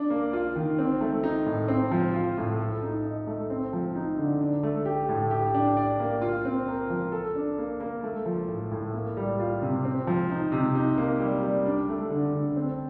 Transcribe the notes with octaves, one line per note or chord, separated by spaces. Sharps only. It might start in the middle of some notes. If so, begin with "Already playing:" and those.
Already playing: D4
A#3
F4
D#3
C4
A3
D#4
A2
C4
F3
F4
A2
A4
D#4
D#5
A3
C4
F3
D#4
D3
D4
A3
G4
A2
G4
D4
D5
A#3
F4
C4
A#4
F3
A4
D4
A#3
A#3
A3
F3
A2
A2
A#3
G3
F4
C3
C4
F3
D#4
C3
D#4
A#3
G3
G3
D4
A3
D3
D3
C4